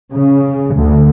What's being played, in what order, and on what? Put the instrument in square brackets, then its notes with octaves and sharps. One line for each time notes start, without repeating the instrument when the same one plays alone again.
[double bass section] C#3
D2